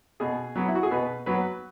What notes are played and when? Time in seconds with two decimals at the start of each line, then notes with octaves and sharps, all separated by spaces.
0.20 B2 G#4
0.56 F#3 B3
0.68 E4
0.75 F#4
0.83 G#4
0.91 B2 B4
1.26 F#3 B3 B4